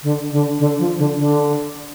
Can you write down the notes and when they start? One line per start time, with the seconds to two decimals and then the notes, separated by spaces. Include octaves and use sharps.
0.03 D3
0.31 D3
0.59 D3
0.79 F3
0.98 D3
1.17 D3